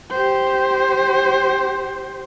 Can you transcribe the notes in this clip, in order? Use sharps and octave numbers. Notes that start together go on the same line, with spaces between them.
G4 C5